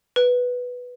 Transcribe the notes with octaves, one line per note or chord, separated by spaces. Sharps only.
B4